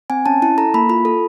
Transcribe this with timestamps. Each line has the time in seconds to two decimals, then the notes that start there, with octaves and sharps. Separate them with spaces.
0.10 C4 G#5
0.26 C#4 A5
0.42 E4 A5
0.58 A4 A#5
0.74 A#3 B5
0.89 F4 B5
1.05 A4